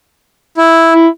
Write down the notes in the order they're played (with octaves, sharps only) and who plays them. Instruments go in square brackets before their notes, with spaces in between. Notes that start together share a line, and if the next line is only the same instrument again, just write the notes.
[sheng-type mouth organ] E4
[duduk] E4